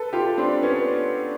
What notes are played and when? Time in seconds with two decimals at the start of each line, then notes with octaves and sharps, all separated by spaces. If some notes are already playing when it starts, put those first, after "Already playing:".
Already playing: A4 B4
0.13 F4 G4
0.38 C4 D4
0.62 B3 C#4